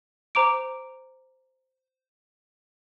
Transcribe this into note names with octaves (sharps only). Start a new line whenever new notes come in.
C5 A#5 D6 D7